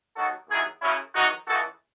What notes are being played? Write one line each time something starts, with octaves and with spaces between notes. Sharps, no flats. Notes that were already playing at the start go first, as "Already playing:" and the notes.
D#2 D#3 F#3 F#4 A4
D#2 D#3 F#3 E4 G#4
F#2 C#3 F#3 C#4 E4
E2 D#3 F#3 D#4 F#4
C#2 C#3 E3 F#4 A4